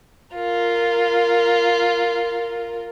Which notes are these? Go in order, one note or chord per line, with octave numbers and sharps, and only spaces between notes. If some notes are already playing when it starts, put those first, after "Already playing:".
F4 A#4